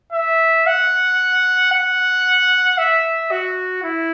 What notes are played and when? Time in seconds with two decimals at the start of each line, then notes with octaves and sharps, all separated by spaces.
0.13 E5
0.67 F#5
1.72 F#5
2.78 E5
3.31 F#4
3.84 E4